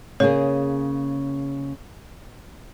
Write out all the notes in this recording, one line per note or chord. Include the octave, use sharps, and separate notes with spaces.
C#3 A#3 G#4 C#5